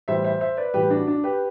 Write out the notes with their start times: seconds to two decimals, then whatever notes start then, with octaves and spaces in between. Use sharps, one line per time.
0.08 A2 E3 G3 C5 E5
0.24 C5 E5
0.41 C5 E5
0.57 B4 D5
0.74 A2 E3 G3 G4 B4
0.90 D4 F#4
1.07 D4
1.24 G4 B4